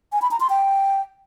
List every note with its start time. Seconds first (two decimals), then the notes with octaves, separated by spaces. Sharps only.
0.12 G#5
0.22 B5
0.31 A#5
0.40 C6
0.50 G5